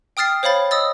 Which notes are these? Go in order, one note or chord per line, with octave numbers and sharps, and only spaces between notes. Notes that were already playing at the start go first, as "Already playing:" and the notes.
G5 D#6 F6 A6 C7
C5 C#5 F5 B5 A6
D#5 D#6 E6 A6